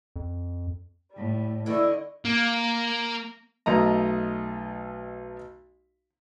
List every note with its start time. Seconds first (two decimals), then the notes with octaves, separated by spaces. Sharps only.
0.16 F2
1.12 A2 G3
1.66 D3 E3 E4 D#5 C#6
2.25 A#3
3.66 B1 A3 D#5 A#5